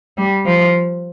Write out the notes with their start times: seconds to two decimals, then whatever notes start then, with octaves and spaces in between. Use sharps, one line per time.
0.17 G3
0.46 F3